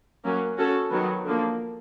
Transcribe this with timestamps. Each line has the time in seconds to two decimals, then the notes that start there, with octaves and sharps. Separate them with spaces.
0.24 F#3 A#3 C#4
0.57 C#4 F#4 A4
0.91 D#3 F#3 B3
1.25 D3 F3 A#3